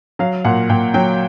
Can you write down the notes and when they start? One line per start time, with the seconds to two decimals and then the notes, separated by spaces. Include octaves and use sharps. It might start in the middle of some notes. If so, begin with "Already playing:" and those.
0.19 F#3 F5
0.45 A#2 F#5
0.70 A#2 G5
0.94 F#3 G5